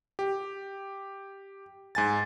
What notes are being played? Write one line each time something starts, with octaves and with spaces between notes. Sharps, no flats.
G4
G#2 G#5 A6